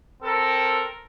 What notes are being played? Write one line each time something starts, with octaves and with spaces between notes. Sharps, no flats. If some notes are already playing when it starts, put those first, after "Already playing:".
C4 A4 A#4